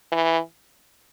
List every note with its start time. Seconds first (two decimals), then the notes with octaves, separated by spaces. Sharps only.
0.12 E3